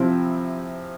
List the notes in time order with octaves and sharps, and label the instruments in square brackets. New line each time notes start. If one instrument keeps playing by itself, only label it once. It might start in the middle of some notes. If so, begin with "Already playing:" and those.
Already playing: [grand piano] C3 F3 C4 E4